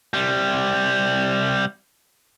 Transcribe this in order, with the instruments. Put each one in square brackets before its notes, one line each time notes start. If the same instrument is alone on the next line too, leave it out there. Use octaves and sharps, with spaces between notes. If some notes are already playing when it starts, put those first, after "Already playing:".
[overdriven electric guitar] C3 G3